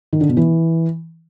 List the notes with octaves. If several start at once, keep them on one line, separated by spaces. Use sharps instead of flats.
D#3
D3
B2
E3